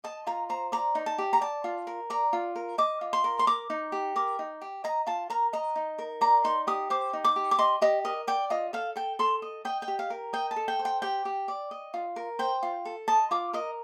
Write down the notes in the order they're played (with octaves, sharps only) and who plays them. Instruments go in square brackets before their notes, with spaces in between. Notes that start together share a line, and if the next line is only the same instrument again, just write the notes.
[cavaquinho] D#5 A5
F4 A#5
C5 A#5
D5 A#5
D#4
A5
G4
A#5
D5 A5
F4
A#4
D5 A#5
F4
A#4
D#5 D6
F4
C6
A#4
C6
A#4 D6
D#4
G4
A#4 D6
D#4
G4
D#5 A#5
F4 A5
A#4 A#5
D#5 A#5
D#4
A#4
D5 A#5
D#4 C6
G4 D#6
C5 D6
D#4
D6
G4
D6
D#5 C6
G4 D#5
A#4 D#5
D5 G5
F4 D#5
A4 F5
A4 G5
A4 C6
D#5
D#5 G5
G5
G4
F5
A#4
D#5 G5
A5
A4
G5
C5
G5
G4 G5
G4
D5
D#5
F4
A#4
C5 G5
F4
A4
D#5 A5
F4 D6
A#4 D#5